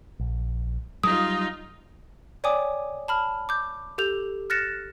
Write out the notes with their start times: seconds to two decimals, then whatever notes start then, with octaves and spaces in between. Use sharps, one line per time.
0.19 A#1
1.04 F#3 G3 D#4 F4 D#6
2.44 C#5 D5 G5 G#5 D6 D#6
3.08 A5 B5 F6
3.49 D6 G6
3.98 G4 A4 G6 F7
4.50 F6 F#6 A6 A#6 C#7 E7